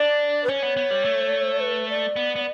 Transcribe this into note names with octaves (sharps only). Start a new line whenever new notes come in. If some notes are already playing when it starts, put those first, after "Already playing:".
Already playing: D4 D5
B4
C#4 C#5
B3
B3
G3
A3
B4
D5
B3
B3